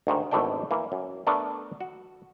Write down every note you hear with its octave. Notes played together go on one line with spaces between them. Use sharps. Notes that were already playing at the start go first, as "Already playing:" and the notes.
D2 G#2 D#3
G#1 E2 B2 A3 D4 G5
E3 A#3
F#2
A3 B3 D4 A#4 D5
F#4